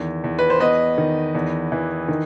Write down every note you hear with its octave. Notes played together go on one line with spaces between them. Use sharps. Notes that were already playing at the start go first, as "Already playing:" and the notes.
Already playing: E2 D#3
E2
B4
C5
B3 B4 D#5
D#3
E2
E3
D#3